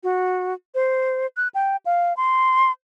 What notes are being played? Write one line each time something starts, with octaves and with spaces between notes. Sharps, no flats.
F#4
C5
F#6
G5
F5
C6